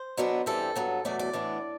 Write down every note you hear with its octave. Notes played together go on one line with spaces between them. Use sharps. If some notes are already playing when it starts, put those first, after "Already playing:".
Already playing: C5
B2 F#3 B3 D4
G2 E3 G3 C4 A4
G2 F#3 B3
E2 B2 F#3 A3 D5
D5
A2 E3 B3 D4